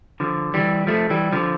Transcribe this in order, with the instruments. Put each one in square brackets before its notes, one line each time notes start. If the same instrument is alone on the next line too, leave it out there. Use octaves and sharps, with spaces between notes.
[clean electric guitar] D3 F3
E3 G3
F3 A3
E3 G3
D3 F3